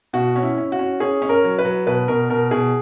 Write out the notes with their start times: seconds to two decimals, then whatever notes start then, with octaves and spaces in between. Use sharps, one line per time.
0.13 B2 F#4
0.36 C#4
0.42 E4
0.58 C#4
0.72 F#4
0.79 C#4
1.00 C#4 G#4
1.22 C#4
1.29 A#4
1.44 F#3
1.59 B4
1.65 F#3
1.87 B2 B4
2.08 B2 A#4
2.29 B2 A#4
2.51 B2 G#4